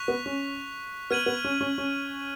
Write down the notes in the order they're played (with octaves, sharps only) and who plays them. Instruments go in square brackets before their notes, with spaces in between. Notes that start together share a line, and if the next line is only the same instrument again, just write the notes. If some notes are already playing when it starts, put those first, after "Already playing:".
Already playing: [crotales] C#6 F#6 B6 F7
[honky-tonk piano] B3
C#4
[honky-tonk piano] B3 [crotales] F6 G#6 D#7 F#7
[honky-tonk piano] B3
C#4
C#4
C#4